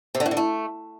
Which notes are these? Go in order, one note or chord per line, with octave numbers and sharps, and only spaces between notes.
C3
D3
A2
D3
A3